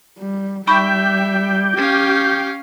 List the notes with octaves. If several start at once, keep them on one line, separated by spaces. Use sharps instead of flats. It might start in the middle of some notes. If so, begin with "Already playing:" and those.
G3
G3 D#4 E5 G5 B5 C#6 D6 G6
C#4 G4 F5